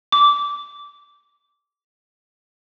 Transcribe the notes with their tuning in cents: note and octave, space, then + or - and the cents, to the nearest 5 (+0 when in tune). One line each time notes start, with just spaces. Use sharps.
D6 -15